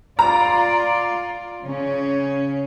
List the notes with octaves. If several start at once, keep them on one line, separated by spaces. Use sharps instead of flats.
F4 D5 A#5
C#3 C#4